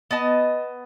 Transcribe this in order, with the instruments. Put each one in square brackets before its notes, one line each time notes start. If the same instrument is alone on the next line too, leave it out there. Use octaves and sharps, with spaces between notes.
[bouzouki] B3 D#5 A5